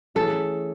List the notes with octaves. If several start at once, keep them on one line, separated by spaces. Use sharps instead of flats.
E3 A3 C#4 G#4 A4